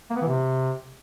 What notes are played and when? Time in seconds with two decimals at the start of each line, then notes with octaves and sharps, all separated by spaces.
0.10 A#3
0.16 B3
0.22 E3
0.27 C3